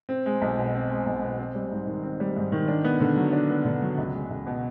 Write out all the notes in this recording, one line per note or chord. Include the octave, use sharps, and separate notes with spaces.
C4
G#3
B1
B2
C4
G#3
B1
B2
C4
G3
G#2
D#3
C4
G3
G#2
D#3
D4
B3
D3
F#3
D4
B3
D3
F#3
C#2
G#3
C#2
B2